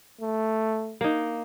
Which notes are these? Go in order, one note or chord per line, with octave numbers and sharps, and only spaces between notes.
A3
A#3 D#4